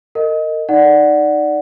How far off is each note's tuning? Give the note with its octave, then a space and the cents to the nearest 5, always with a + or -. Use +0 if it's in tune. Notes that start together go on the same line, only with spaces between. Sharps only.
A#4 -35 D#5 +0
D#4 -5 D5 +0 F#5 +0